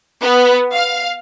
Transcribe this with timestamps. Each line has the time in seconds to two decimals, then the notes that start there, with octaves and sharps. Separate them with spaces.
0.22 B3
0.75 F5